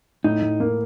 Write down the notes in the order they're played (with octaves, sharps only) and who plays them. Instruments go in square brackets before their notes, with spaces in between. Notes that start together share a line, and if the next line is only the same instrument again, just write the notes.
[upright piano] A2 [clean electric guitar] D#4
[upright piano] A2
A#3